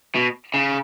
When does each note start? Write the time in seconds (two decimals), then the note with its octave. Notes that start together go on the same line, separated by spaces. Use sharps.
0.15 B2
0.54 C#3